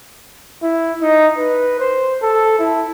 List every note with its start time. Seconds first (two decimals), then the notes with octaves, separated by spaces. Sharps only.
0.63 E4
1.02 D#4
1.37 B4
1.80 C5
2.22 A4
2.59 E4